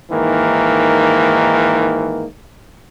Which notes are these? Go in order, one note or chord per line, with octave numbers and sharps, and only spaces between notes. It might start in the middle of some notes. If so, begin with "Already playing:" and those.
G#2 D#3 E3 A#3